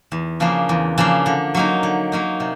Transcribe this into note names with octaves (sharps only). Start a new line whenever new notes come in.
E2
C#3 F3 A#3 D4
E2
C#3 F3 A#3 D4
D3
F#3 A#3 D#4
D3
F#3 A#3 D#4
C3